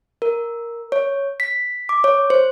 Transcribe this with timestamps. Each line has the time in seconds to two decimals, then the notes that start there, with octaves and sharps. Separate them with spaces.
0.22 A#4
0.92 C#5
1.40 B6
1.89 D6
2.04 C#5
2.30 C5